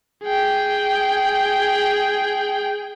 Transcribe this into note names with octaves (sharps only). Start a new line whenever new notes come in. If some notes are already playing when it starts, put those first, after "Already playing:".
G#4 G5